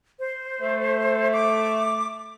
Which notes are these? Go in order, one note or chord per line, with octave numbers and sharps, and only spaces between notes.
C5
A3
D6